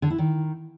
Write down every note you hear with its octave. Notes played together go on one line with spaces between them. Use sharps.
D3
E4
D#3